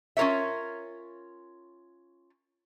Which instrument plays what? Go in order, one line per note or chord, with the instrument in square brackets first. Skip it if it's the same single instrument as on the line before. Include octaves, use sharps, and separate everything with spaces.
[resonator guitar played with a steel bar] C#4 F4 A#4 C#5 E5